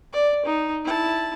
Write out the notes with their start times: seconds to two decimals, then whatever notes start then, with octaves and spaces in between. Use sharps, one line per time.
0.13 D5
0.45 D#4
0.84 E4 A5